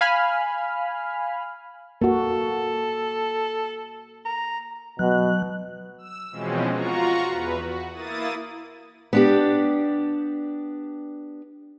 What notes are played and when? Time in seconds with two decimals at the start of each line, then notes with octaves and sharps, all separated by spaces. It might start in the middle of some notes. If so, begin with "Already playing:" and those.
0.01 F5 G#5 B5 F6
2.02 A#3 F#4 A4
4.25 A#5
4.99 B2 F#3 F#6
5.98 E6
6.31 B2 E3 F3 G#3 C4 C#4
6.71 F4 F#4 A#5 C#6
7.27 E2 B4
7.59 F#4
7.93 A#3 E4 D#6 A6 D#7
9.13 B3 D4 G4